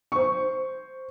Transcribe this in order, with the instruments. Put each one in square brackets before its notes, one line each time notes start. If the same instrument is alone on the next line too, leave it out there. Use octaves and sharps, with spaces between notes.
[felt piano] C5 C#6